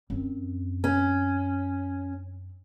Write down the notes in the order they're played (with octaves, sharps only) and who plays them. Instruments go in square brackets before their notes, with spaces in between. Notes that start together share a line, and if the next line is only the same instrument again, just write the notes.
[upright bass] F#2 C4
[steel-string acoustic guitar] C#4